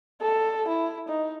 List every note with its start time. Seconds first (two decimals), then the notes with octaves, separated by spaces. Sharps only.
0.22 A4
0.68 E4
1.09 D#4